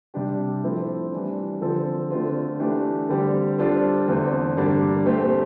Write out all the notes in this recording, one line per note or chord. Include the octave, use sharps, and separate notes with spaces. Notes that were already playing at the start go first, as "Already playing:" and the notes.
C3 G3 D4 G4
A2 F3 C4 E4 A4
E3 G3 D4
D3 F3 C4 F4 A4
D3 A3 C4 F4
E3 A3 D4 G4
D3 G3 C4 G4
G3 D4 F4 A4 C5
E2 D3 A3 C4
G2 D3 G3 A#3 D4
A#2 A3 C4 G4 C5